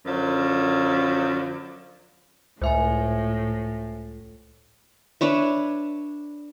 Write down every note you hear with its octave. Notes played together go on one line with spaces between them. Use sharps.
F#2 D3 F3
C#2 A2 C5 E5 G#5
D4 B4 C#5 E5